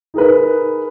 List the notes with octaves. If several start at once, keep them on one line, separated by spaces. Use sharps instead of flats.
D#4 G#4 A#4 B4